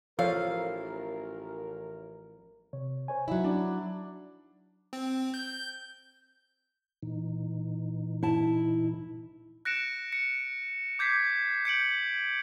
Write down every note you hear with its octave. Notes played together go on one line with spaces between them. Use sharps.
A1 F3 A4 A#4 C#5 F5
C3 C#5
C5 C#5 G#5
F#3 D#4 E4 E5
D4
C4
G6
A#2 E3 D#4
E4 A5
F#6 A#6 C#7 D7 E7
C#7
D6 G6 G#6 B6 C7
G6 C#7 D7 F#7